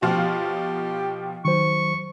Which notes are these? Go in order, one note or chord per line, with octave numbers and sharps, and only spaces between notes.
B2 F3 F4 G4
D#3 F#3 C5 C#6